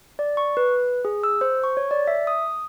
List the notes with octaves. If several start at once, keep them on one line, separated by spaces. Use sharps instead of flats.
D5
C#6
B4
G#4
E6
C5
C#6
C#5
D5
E5
D#6